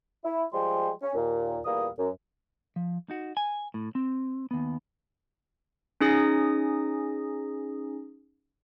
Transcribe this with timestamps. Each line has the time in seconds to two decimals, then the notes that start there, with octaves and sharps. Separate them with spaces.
0.24 E4
0.53 F3 G3 G#3 G#4 G5 C6
1.02 C#4
1.15 D#2 A#2
1.65 E2 A#2 G3 A#3 A#4 D#6
1.98 F#2
2.76 F3
3.10 D#4 F#4
3.37 G#5
3.74 A2
3.95 C4
4.51 D#2 B3
6.01 C#4 D#4 G#4 D#6 A#6